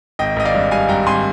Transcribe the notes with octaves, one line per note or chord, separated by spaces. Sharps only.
G#1 D#5 G5
G#1 D#5
D5 F5
G2
G3 F5 G#5
G2 G5 A#5
G#1 G#5 C6